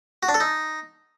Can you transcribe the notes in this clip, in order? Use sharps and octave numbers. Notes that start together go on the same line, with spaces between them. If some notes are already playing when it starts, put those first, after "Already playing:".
F#4
D4
A4
D#4